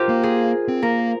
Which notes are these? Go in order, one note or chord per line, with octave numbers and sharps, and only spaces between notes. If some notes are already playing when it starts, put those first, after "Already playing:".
Already playing: F4 G4 A#4 C5
A#3
G#4
C4
A#3 A#4